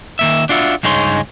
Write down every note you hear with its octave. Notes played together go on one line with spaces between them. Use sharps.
D#3 A#3 E5
D4 F4 F#4 E5
C#2 G2 D#4 G#4 C#5 C6